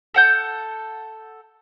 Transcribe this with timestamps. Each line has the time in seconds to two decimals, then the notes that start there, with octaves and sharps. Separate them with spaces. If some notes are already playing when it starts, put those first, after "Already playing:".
0.14 A4 F#5 G6